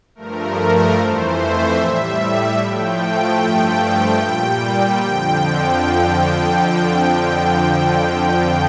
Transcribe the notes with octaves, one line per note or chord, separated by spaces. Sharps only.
G2 F3 A3 A#4
F2 E3 A3 C5
E5
A2 G3 E5
A2 F3 A3 G5
G2 F3 A3
A#2 G3
F2 D3 F3 G5